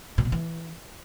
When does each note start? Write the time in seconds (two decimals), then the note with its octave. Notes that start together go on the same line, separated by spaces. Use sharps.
0.18 A#2
0.25 B2
0.32 E3